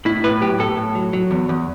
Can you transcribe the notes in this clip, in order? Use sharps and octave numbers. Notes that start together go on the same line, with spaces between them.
A2 E4
A2 B4
F#3 G4
A2 A4
A2
F#3
F#3
E2
E2